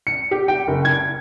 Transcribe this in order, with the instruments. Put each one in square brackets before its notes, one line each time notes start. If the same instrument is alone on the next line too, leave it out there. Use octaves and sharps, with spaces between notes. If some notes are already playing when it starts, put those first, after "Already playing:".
[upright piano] C#7
G4
G5
F#1
G#6